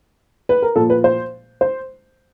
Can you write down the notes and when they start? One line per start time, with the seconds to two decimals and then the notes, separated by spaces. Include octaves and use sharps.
0.49 B4
0.62 A#4
0.76 A#2 F3 A4
0.90 B4
1.04 C5
1.61 C5